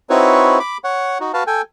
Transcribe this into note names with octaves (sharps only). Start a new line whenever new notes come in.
C4 D#4 E4 F#4 B4 C#5
B5 D6
C#5 F#5
D#4 F#4
F#4 B4 F5 A5
A4 G5 G#5